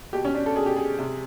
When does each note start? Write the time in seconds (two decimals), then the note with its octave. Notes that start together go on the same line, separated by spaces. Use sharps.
0.13 B2 G4
0.25 C#4
0.35 D4
0.46 A4
0.56 B2 G#4
0.66 G4
0.76 G#4
0.98 C3